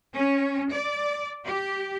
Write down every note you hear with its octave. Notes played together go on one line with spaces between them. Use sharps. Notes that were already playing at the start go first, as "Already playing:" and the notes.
C#4
D5
G4